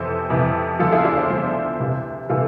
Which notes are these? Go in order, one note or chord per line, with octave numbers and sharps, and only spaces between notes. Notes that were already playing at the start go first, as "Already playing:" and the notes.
Already playing: F2 C3 E3 A4 C5
F2 C3 E3
D2 D3 F3 F4 A4
E4 G#4
D4 F4
C5 E5
D2 D3 F3 C5 E5
D2 C3 E3
C3 E3 F4 A4